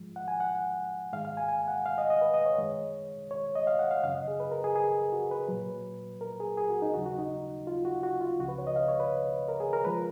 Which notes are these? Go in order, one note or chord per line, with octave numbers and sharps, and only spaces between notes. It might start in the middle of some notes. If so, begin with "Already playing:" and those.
Already playing: G#2 F3 G#3
F#5
G#5
F#5
G#2 D#3 G#3 F5
F5
G#5
G#5
F#5
F5
D#5
D#5
B4
D#5
C#5
F#2 D#3 G#3
C#5
D#5
F5
F#5
F5
F#2 C#3 F#3 F5
D#5
G#4
B4
A#4
G#4
G#4
F#4
B4
A#2 F#3
A#4
G#4
G#4
F#4
D#4
D#2 C#3 F#3 F#4
F#4
D#4
F4
F#4
F#4
F4
C#2 C#3 F3 F#4
B4
C#5
D#5
F5
C#5
B4
A#4
G#4
A#4
F3 G#3 B4